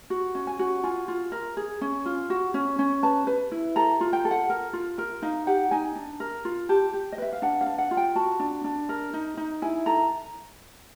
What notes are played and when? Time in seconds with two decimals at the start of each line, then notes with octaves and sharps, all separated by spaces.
0.10 F#4
0.35 C#4
0.47 G#5
0.59 F#4
0.83 F4 G#5
1.08 F4
1.32 A#4
1.57 G#4
1.81 C#4
2.06 F4
2.30 F#4
2.54 C#4
2.79 C#4
3.03 B4 A5
3.27 B4
3.52 E4
3.76 A4 A#5
4.01 F4
4.13 G5
4.25 A4
4.31 F#5
4.50 A#4
4.73 F4
4.98 A#4
5.22 D#4 F5
5.47 G4 F#5
5.71 D#4 G#5
5.96 D4
6.20 A#4
6.45 F4
6.69 G4 A5
6.93 G4
7.12 D#5
7.18 B4 E5
7.33 F5
7.42 D4 F#5
7.61 F5
7.66 D4
7.78 F#5
7.91 F4
7.97 G5
8.15 F#4 A5
8.40 D4
8.64 D4
8.89 A#4
9.13 D#4
9.37 D#4
9.62 E4 G#5
9.86 A4 A#5